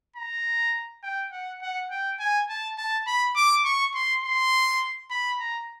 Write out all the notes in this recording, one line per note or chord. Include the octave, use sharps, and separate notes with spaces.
A#5
G5
F#5
F#5
G5
G#5
A5
A5
B5
D6
C#6
C6
C6
B5
A#5